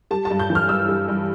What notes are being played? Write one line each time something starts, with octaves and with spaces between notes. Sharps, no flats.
G3 A5
A5
G2
G6
E3
F6
G2 E6
G3
G2